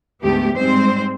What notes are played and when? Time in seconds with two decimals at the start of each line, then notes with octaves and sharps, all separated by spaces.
0.22 D2 G#2 A3 B3 G4
0.56 G#2 G3 G#3 C4 C5